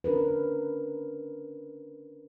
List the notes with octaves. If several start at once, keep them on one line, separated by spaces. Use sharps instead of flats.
C#4 D4 A#4 B4